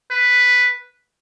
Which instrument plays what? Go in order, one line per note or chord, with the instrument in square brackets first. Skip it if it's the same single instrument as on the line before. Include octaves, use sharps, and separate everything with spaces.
[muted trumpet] B4